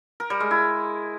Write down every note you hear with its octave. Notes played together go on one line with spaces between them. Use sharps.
A#4
G3
G#3
E4